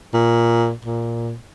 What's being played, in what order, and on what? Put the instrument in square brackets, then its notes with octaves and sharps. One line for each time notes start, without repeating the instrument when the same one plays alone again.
[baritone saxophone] A#2
A#2